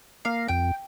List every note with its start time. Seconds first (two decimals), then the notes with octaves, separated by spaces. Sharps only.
0.25 A#3 F5
0.48 F2 G5